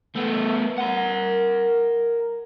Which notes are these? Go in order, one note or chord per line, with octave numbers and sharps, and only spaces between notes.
A3 B3
A#4 F#5